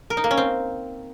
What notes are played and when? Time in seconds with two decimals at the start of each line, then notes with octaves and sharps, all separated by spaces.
0.10 A#4
0.17 D#4
0.24 A#3
0.31 C#4
0.37 C4